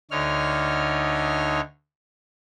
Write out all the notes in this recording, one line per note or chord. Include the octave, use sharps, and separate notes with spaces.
D2 D3 D#4 C#5 F6